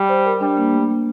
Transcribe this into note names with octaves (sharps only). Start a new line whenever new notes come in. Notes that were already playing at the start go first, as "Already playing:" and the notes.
Already playing: G3
C5
A#4
G3 D4
A#3
A3
A#3